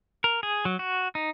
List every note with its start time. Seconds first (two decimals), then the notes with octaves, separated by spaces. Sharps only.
0.24 A#4
0.43 G#4
0.65 F#3
0.79 F#4
1.15 D#4